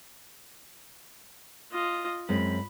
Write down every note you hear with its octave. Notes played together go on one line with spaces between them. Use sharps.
F4 D#5
F#2 G#3 C4 B5